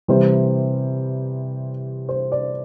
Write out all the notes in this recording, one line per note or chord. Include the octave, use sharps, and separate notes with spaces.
C3 E3 G3 C5
C5
D5